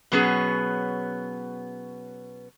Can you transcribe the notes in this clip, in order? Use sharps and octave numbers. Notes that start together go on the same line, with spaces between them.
B2 F#3 B3 C#4 G#4